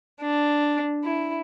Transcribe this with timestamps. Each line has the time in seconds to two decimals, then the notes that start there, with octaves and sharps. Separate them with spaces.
0.21 D4
1.05 E4